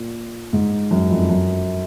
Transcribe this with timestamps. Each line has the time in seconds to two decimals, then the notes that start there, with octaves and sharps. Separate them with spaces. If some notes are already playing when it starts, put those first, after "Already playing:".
Already playing: A#2
0.53 G#2
0.91 F#2
1.10 F2
1.30 F#2